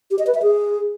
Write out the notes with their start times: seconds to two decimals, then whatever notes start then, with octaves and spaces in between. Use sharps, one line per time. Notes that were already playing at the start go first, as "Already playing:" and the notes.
0.11 G4
0.19 D#5
0.27 B4
0.35 E5
0.42 G#4